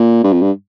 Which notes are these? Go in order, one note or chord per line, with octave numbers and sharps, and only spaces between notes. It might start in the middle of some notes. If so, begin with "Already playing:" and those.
Already playing: A#2
G2
F2
G2